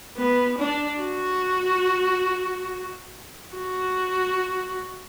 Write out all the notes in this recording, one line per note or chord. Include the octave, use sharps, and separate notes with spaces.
B3
D4
F#4
F#4